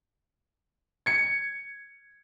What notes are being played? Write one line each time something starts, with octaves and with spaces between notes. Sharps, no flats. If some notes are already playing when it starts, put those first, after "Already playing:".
G#6 C#7